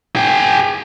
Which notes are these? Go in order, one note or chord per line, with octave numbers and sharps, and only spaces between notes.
G#4 G5